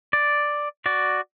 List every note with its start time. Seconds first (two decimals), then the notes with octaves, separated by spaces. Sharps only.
0.13 D5
0.86 F#4 D5